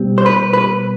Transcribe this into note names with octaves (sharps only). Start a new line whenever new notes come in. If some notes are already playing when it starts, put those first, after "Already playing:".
Already playing: B2 G3 C4
C5
B4
B4